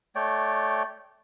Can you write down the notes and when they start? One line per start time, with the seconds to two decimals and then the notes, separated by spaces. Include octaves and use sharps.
0.15 A3 C#5 D5 G5